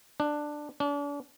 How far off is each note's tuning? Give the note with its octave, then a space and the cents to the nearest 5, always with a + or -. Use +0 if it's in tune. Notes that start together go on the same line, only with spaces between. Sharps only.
D4 +10
D4 -40